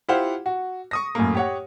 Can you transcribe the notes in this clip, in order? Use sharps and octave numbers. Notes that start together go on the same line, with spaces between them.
E4 F4 G4 C5 F5 F#5
F#4
C#6 D#6 A#6
F#2 A2 A3 A#3
G4 C#5 F#5